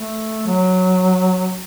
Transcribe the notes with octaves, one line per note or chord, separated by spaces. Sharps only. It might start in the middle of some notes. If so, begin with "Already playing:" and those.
Already playing: A3
F#3